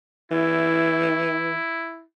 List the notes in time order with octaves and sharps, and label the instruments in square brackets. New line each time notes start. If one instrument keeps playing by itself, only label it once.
[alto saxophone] E3 [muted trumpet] E4